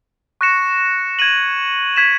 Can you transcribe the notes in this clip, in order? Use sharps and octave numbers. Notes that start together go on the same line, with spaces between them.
C#6 F#6 A#6 C#7 E7
G#6 D#7 F#7
G#6 B6 E7